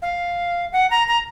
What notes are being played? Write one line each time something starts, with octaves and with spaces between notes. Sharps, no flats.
F5
F#5
A#5
A#5